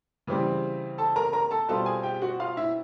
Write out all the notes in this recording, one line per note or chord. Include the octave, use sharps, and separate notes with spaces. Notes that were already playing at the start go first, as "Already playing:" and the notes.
C#3 E3 G3 C4
A4 A5
A#4 A#5
A#4 A#5
A4 A5
B2 G3 C4 F4 A4 A5
G#4 G#5
G4 G5
F#4 F#5
F4 F5
E4 E5